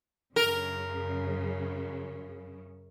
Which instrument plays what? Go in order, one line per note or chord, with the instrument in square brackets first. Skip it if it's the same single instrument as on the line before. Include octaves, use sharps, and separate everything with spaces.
[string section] F#2 C#3 [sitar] A#4